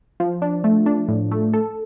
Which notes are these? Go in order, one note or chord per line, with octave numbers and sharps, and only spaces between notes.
F3
D4
A3
D4
A2
A3
A4